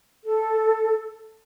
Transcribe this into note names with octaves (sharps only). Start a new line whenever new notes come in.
A4